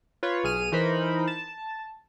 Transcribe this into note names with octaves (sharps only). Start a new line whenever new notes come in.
F4 B4 C#5
B1 G#4 F6 D#7
E3 D#4 A#4 C5 B5
A5